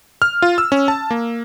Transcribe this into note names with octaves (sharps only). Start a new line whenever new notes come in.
F6
F4
E6
C#4
A5
A#3